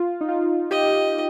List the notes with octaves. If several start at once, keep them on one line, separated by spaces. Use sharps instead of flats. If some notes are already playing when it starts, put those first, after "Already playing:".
Already playing: F4
D#4
F4
G4 D#5